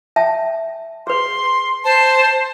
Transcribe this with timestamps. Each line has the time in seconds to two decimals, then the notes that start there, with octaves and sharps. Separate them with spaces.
0.16 E5 G5 A5
1.07 G#4 B4 C6
1.85 C5 A5